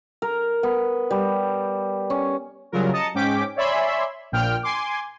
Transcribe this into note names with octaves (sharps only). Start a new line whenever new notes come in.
A#4
B3
G3
C#4
C#3 F#3 G3 F4 A#4
D#5 A5 A#5 C#7
G#2 C#4 G5 D6 B6
C#5 D5 E5 G#5 B5 C6
A#1 A#2 G5 F6
G#5 C6 D6